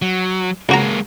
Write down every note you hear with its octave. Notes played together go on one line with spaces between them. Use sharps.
F#3
C#2 G#3 A#3 F#4 A#5